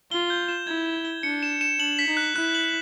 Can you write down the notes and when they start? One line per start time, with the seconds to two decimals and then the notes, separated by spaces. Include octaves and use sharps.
0.11 F4 G7
0.30 G6
0.48 E7
0.67 E4 G#6
0.86 E7
1.05 G7
1.23 D4 C#7
1.43 E7
1.61 E7
1.79 D4 F#7
1.99 B6
2.07 D#4
2.17 F#6
2.36 E4 F#6
2.55 F#7